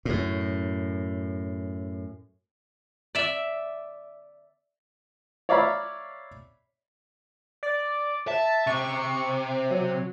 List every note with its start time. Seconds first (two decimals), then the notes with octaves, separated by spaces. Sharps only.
0.05 F#2 A2
3.15 D5 E5
5.49 C#5 D5 E5 F5 A#5 B5
7.63 D5
8.28 E5 A5
8.67 C3 C#6
9.70 F#3